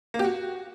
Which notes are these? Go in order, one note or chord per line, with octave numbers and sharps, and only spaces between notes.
A#3
G4
F#4